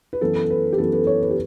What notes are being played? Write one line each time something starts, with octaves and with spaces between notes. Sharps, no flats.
B4
F#2 E3 B3 A4
B4
G4
F#2 E3 B3 A4
B4
C#5
B4
G4